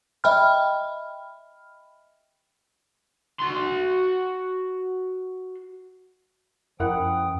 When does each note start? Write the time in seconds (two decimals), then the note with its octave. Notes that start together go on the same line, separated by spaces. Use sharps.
0.24 D#5 E5 G5 B5 F6
3.39 F#4 C6
6.80 F#2 F3 E4 A#4 F#5 G5 D#6